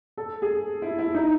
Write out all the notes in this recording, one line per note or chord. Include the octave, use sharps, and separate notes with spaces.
A4
G#4
E4
E4
D#4